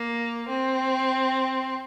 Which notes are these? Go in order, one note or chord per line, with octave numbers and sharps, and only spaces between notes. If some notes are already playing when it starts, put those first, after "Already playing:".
Already playing: A#3
C4